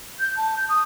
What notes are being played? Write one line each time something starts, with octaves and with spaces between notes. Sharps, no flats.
G6
A5
G6
D#6